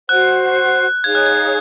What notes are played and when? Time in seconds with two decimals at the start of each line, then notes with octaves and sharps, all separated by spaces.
0.08 F#4 C5 F#5 F#6
1.04 D#4 G#4 C#5 F5 G#6
1.15 F#6
1.26 G#6